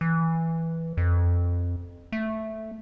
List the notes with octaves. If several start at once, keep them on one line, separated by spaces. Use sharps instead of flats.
E3
F2
A3